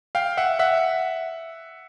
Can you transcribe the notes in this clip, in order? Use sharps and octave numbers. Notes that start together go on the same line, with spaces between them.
F5 G5
E5 F#5
E5 F#5